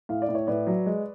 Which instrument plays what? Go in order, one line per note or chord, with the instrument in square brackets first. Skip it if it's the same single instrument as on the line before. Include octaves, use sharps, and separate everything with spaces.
[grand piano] A2 F5
D5
A2
C#5
A2 B4 D5
F#3
G#3